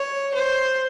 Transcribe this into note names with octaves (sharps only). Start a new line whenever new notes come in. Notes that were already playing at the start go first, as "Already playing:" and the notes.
Already playing: C#5
C5